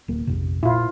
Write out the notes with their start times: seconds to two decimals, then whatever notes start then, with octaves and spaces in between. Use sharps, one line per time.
0.08 D1 A#3
0.27 A#1 F2 C3
0.63 A#2 E4 F4